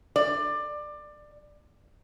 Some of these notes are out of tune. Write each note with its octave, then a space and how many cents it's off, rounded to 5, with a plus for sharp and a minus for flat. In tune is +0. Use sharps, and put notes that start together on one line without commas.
D5 +20